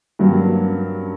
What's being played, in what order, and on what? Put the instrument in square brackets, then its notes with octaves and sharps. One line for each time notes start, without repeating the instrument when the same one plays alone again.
[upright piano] G2 F#3 A#3